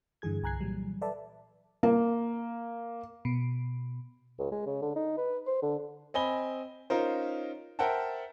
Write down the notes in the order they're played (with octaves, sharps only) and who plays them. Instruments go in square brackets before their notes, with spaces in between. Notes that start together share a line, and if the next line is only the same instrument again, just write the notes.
[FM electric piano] G2 D3 E3 G#4 G#6
C2 G#5 A#5 F#6 G#6 C7
A#2 E3 F#3 G3
A4 B4 D5 E5 A5
[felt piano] A#3
[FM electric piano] B2
[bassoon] C#2
G#3
C#3
D3
D#4
B4
C5
D3
[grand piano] C4 D#5 G#5 B5 G7
C#4 D#4 F4 A#4 C5
A#4 C5 E5 F#5 G5 A5